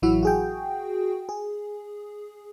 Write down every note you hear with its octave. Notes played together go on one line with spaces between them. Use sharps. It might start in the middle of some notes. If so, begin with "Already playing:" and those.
A1 E3 F#3 E4 F#4 E5
F#4 G#4 G5
G#4